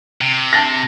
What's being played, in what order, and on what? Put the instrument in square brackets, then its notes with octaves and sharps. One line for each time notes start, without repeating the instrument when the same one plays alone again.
[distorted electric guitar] C3
[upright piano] A5 A6 A#6